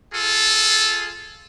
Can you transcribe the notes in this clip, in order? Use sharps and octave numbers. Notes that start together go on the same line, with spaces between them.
F4 G#4 A4